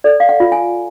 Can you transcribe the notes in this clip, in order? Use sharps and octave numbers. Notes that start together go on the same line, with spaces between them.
A4 D5
F5
F#5
F4
G#5